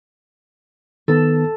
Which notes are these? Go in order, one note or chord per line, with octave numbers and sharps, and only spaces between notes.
D#3 B3 A4